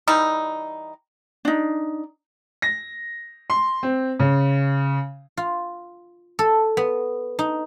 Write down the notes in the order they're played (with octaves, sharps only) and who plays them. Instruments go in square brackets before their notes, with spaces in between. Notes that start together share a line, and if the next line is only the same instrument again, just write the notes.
[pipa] E3 G3 D#4
[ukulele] D4 D#4
[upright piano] A#6
C6
C4
C#3
[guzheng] F4
A4
B3
D#4